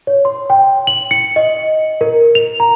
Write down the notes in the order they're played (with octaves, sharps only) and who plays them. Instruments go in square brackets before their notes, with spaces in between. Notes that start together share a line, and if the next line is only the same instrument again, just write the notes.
[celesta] C#5
C6
G5
F#7
C#7
D#5
A#4
F7
A#5